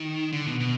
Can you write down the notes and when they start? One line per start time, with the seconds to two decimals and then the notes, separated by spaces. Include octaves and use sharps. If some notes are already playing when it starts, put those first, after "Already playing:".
Already playing: D#3
0.32 D3
0.46 B2
0.60 B2